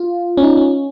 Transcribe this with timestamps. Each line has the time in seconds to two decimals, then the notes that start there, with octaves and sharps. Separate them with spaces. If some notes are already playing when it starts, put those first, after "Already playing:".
Already playing: F4
0.37 C#4
0.43 D#4
0.57 C#4